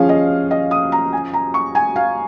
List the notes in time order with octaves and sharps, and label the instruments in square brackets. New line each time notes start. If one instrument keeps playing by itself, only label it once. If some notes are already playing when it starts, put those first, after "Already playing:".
Already playing: [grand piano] F3 C#4 G#4 [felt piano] F5
[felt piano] D#5
D#5
D#6
A#5
G#5
A#5
C#6
G#5
F5